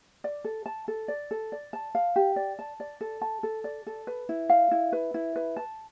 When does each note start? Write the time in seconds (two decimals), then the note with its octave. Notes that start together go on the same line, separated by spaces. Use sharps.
0.24 D5
0.44 A4
0.66 A5
0.88 A4
1.08 D5
1.31 A4
1.52 D5
1.73 A5
1.95 F5
2.16 G4
2.36 D5
2.59 A5
2.80 D5
3.01 A4
3.22 A5
3.43 A4
3.64 D5
3.87 A4
4.07 B4
4.29 E4
4.49 F5
4.71 E4
4.92 B4
5.14 E4
5.36 B4
5.57 A5